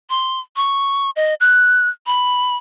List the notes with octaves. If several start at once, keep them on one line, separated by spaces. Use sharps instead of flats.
C6
C#6
D#5
F#6
B5